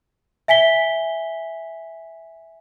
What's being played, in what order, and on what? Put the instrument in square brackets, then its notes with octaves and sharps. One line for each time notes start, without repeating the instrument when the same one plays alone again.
[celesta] E5 G#5 B6 G7